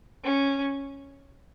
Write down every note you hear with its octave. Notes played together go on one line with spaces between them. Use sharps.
C#4